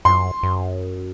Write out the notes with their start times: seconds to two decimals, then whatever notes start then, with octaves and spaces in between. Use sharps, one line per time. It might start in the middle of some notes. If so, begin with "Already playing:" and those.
0.05 F#2 C6
0.43 F#2